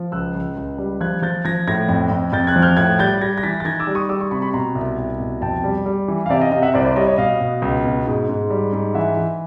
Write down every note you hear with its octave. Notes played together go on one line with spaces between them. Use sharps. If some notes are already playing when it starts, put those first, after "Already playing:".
Already playing: F3
C#2 E6 F#6
C#2
C#2
G3
F3 F#6 G#6
F3 G6 A6
F3 G#6 A#6
A2 G#6 A#6
F2
F2
F2 G6 A6
F#6 G#6
F3
F6 G6
A2 F#6 G#6
G3 G6 A6
G3 G#6 A#6
A#6
E3 A6 B6
A6
D#3 G#6 A#6
D6 E6
G3
C#6 D#6
G3 D6 E6
C#6 D#6
C3 B5 C#6
B5 C#6
B2 A#5 C6
C2
C2
B2
F2 G5 A5
G3
G3
E3
F5
C3 D5 E5
D#5 F5
C3 D#5 F5
E5 F#5
C2 C5 D5
C5 D5
G3 C#5 D#5
C#5 D#5
B2 D#5 F5
B2
C#2
B2
G#2
G#2
G3
G#2
E3 E5 F#5
E3